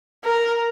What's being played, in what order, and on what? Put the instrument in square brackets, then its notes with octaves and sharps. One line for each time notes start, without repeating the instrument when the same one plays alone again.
[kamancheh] A#4